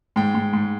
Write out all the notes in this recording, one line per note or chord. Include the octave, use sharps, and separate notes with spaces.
G#2 G5
G#2
G#2